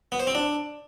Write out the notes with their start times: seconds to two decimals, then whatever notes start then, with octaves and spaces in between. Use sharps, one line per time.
0.12 B3
0.20 C5
0.27 C4
0.35 D4